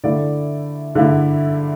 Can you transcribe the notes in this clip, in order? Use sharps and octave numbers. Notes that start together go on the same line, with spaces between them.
D3 A3 E4 D5
D3 A3 E4